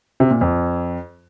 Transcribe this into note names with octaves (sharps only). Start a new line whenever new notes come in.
C3
A#2
F2